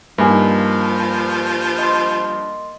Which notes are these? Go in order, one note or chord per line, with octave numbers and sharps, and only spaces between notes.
G2 F3 A#3 D#4 G#5
D#5 C6